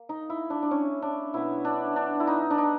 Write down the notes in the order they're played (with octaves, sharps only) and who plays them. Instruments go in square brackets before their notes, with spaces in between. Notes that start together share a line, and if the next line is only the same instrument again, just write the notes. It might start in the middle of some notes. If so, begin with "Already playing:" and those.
Already playing: [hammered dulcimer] A#3
D#4
E4
D4
D4
C#4
D4
B2 F#3 B3 E4
D4
D4
E4
D#4
D4
D#4